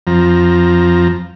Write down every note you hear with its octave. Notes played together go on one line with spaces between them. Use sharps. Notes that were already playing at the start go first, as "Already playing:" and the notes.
F2 F3 A#5